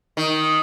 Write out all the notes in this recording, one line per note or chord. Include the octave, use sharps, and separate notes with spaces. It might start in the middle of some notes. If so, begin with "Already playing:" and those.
D#3